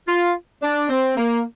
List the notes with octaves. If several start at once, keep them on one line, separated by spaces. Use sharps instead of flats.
F4
D4
C4
A#3